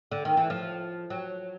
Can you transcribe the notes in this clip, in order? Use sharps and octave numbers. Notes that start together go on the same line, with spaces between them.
D3
D#3
E3
F3
F#3